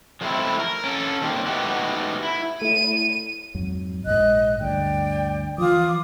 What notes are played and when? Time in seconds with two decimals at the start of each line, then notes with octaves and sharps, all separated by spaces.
0.21 F3 G#3 A3 C4 E4
0.59 A#4
0.84 C#4 A4
1.21 D#3 G3 A#3 C4
1.46 G#3 A3 B3 D#4 F#4 G4
2.23 E4
2.62 A3 E4 D#7
3.55 F2 G#2 F#3
4.06 A#1 G#2 D#5 F#6
4.61 D2 G2 D5 G5
5.58 E3 F3 F4 D6 D#6